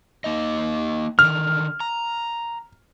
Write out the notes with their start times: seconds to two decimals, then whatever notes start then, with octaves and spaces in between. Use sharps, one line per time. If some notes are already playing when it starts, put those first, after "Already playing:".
0.24 A#3 D#4 D#5
1.19 D3 D#3 F6
1.80 A#5